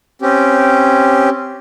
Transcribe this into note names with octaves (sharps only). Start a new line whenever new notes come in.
C4 C#4 G4